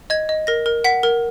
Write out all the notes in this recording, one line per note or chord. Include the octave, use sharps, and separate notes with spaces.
D#5 G#6
D#5
A#4 A#6
A#4
F#5 B6
A#4